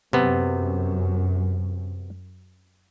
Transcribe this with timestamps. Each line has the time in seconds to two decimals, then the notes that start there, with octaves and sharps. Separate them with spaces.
0.13 F#2 C3 B3